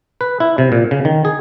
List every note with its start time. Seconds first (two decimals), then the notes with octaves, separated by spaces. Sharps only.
0.21 B4
0.40 E4
0.58 C3
0.72 A#2
0.91 C#3
1.05 D#3
1.25 G#4